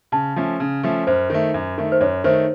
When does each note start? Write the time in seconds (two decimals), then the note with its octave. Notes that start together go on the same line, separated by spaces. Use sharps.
0.12 C#3 A5
0.36 F3 A3 C#4
0.60 C#3
0.83 F3 A3 C#4
1.07 F#2 C5
1.30 D#3 A3
1.54 F#2
1.78 D#3 A3
1.92 C5
2.01 F#2 C#5
2.24 D#3 A3 C5